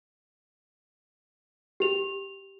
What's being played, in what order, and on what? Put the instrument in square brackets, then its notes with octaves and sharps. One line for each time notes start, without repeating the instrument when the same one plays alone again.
[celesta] G4 F7